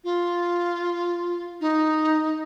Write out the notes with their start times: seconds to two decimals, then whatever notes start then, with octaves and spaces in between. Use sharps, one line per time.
0.04 F4
1.60 D#4